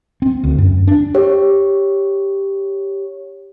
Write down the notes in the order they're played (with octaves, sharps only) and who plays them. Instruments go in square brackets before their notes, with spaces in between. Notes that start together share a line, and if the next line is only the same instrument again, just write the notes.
[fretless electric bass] C4
D2
F#2
D4
[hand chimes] G4 C#5